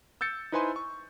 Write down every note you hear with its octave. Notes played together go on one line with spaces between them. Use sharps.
E6 G6 A6 C#7
D#4 E4 B4 C5 G#5 C6
C#6